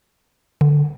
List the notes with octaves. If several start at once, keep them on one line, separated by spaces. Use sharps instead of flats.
D3